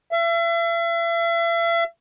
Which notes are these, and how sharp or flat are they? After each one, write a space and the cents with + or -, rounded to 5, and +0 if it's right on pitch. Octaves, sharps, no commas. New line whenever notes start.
E5 +40